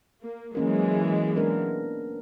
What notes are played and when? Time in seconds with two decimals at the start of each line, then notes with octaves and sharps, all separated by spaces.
0.23 A#3
0.55 E3 F#3 G#3 A#3 C#4 A#4
1.36 B3 D4 A#4